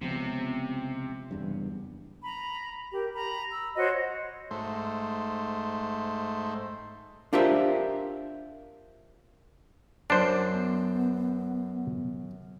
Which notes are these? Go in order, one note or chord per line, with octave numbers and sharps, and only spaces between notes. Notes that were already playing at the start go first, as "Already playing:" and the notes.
C#2 C3 F3 B3
F#1 E2 G2
A#5 B5
G4 A#4
A#5 B5
E6
F#4 C5 C#5 D#5
G#2 A3 C5
D4 F4 G4 A#4 C5 E5
F#2 D4 C5
B3